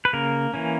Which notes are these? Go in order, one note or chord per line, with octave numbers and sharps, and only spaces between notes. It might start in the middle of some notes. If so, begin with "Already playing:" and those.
B4
C#3 A#3 A#4
E3 A#3 C#4